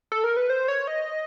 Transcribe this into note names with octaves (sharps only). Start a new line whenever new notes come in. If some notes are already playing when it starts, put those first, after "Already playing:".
A4
A#4
B4
C5
C#5
D#5